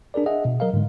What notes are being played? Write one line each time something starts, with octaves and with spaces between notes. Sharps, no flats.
D4 G#4 A#4 D5
G#4 D#5 E5 F#5
B2
F#3 A#4 D#5 F5
G#2 D3 G#3